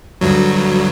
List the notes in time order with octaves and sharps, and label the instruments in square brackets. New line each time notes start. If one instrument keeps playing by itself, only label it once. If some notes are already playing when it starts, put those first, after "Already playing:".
[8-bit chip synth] D2 G2 F#3